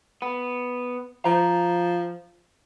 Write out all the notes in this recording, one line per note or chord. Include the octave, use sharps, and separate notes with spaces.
B3
F3 A#5